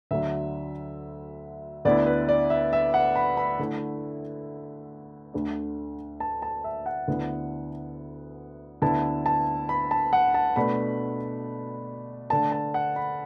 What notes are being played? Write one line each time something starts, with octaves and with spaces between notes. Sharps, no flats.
D2 D3 F#3 E5
D2 D3 B3 E4 D5
B4
D5
E5
E5
F#5
B5
B5
D3 A3 E4
D2 D3 A3 D4
A5
A5
E5
F#5
D2 D3 B3 E4
D2 D3 B3 E4 A5
A5
B5
A5
F#5
A5
B2 A3 D4 B5
D3 A3 D4 A5
A5
F#5
B5